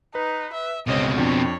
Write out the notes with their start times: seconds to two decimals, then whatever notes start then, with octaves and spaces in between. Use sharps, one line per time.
0.15 D#4 B4
0.53 E5
0.87 G1 C#2 B2 C4 C#5 D#5
1.18 F2 D4 C#5 G5